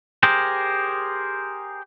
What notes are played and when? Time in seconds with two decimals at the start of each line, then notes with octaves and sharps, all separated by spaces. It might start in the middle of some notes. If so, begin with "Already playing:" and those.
0.23 G4 G#4 A#4 C5